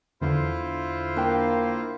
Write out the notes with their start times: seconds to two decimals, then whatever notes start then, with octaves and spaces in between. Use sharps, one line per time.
0.21 E2 D3 E4 F4 C5
1.17 A#3 D4 G5